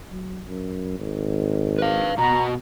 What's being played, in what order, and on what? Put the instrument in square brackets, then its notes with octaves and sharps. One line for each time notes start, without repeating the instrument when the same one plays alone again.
[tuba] F#3
F#2
G#1
[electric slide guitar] B4 F5
[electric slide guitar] B2 F#4 [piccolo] A#5